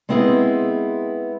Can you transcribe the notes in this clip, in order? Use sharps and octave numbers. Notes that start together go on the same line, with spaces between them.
G#3 B3 C4 E4 G#4 A4